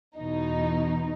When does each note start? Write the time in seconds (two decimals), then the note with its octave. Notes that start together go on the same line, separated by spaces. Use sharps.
0.17 E2 B2 D#4